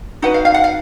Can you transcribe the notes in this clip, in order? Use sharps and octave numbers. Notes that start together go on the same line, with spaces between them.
D#4 F#4 B4 F#5
F5
F5
F#5
F5